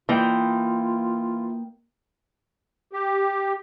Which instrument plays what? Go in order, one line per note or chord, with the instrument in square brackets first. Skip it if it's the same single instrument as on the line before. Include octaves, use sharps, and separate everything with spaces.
[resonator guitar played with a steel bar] E3 [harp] A#3 D#5 G5 [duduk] F4
[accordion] G4